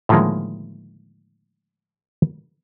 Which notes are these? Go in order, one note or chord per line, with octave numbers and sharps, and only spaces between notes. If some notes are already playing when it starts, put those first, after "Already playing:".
A2 D3 D#3 F3 G#3 A#3